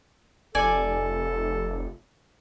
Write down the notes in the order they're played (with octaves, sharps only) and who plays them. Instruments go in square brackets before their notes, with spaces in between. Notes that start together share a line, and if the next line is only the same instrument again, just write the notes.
[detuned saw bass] F1 [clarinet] A4 [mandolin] D5 G#5